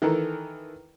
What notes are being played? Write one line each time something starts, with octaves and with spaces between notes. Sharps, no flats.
D#3 E3 A4 A#4